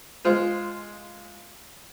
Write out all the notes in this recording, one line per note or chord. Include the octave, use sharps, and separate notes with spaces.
G#3 F4 C5